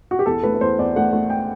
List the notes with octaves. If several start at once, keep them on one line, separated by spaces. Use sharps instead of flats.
F#4
G4
E2 A4
A3 B4
B4
E2 C5
E2 D5
A3 F#5
A3
G5